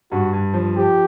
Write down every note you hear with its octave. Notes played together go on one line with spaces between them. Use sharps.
G2 F#4
G2
F3
F3 G4